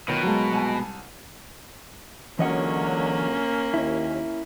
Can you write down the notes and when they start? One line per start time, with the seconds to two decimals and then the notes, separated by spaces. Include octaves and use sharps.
0.08 B2 D#3 F#3 F4
0.23 F#3 G#3 A#4 F5 A5
0.51 C2 G#5 A5
2.39 C#2 D3 E3 F#3 A#3 C#4 D#5 F#5
3.74 D#2 E4